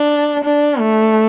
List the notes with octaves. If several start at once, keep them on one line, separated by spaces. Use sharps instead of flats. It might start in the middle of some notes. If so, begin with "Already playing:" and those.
Already playing: D4
D4
A3